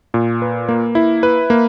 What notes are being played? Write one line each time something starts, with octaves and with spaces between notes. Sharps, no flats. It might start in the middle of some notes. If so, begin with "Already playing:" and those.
A#2
B4
A#3
E4
B4
A#3